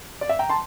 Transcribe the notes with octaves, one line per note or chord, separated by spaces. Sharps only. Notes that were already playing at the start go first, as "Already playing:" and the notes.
D5
E5
G5 A#5
A5 C6